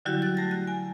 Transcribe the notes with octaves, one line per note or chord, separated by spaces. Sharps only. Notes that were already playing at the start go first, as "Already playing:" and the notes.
D3 F#3 G3 E4 F#4 G4
F#4 A6
A3 A#6
F#6
G#5